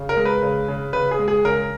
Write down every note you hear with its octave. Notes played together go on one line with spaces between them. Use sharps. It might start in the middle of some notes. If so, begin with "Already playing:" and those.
Already playing: C#3
A#4
G#3
B4
C#3
C#3
C#3 B4
G#4
G#3
G#4
C#3 A#4